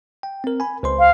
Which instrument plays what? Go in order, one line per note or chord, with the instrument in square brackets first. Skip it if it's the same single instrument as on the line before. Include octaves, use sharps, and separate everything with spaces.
[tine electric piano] G5
C4 A#4
G#5 B5
C#2 C5 C6
[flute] F5